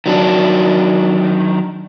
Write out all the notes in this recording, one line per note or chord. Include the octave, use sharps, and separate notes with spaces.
D#3 F#3 D4